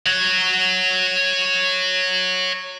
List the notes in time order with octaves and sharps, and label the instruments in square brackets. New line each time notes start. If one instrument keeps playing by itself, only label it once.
[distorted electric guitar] C#5 F#5